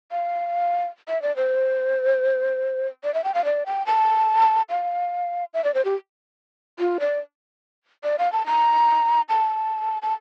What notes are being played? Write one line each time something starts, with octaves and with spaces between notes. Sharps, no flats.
F5
E5
D5
C5
D5
E5
G5
F5
D5
G5
A5
F5
E5
D5
C5
G4
F4
D5
D5
F5
A5
A#5
A5
A5